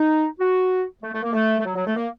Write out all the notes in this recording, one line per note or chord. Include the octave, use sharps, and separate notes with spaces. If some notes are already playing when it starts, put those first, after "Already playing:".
Already playing: D#4
F#4
A3
A3
A#3
A3
A3
F#3
F#3
A3
A#3